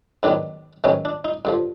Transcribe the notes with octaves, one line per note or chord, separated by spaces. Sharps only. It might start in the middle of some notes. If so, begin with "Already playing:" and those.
G#2 D#3 F#3 B3 D4
G#2 D#3 F#3 B3 C#4
D4
D#4
G2 D3 F3